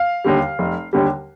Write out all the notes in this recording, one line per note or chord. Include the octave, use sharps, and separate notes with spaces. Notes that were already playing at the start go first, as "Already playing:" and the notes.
Already playing: F5
D#2 D3 G3
F1
D#2 D3 G3